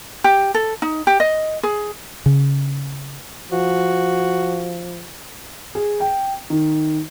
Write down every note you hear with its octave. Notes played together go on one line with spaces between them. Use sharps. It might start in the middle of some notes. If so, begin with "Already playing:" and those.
G4
A4
D#4
G4
D#5
G#4
C#3
F3 F#4
G#4
G5
D#3